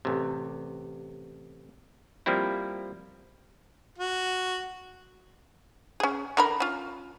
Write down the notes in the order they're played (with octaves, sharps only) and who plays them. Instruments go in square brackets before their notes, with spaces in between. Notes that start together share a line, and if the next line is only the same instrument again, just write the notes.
[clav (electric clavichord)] A1 C3
F3 G3 A#3 C4 E4
[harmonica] F#4
[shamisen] C#4 G#4
D3 A#4 B5
C#4 F4